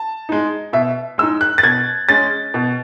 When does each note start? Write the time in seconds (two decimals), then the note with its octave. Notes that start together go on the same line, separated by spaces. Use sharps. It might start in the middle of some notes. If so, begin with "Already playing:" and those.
Already playing: A5
0.29 G#3 D#4
0.73 B2 E5
1.18 G#3 D#4 E6
1.41 F#6
1.58 A6
1.63 B2 G#6
2.09 G#3 C#4 A6
2.54 B2